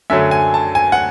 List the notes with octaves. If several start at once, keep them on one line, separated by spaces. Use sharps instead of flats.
F#2 D3 F#3 A3 E5
G#5
A5
G#5
F#5